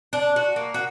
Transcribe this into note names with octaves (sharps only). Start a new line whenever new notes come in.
D4
F#4
A#3
F#4